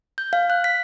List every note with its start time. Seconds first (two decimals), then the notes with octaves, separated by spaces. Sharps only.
0.18 G6
0.33 F5
0.50 F#6
0.64 B6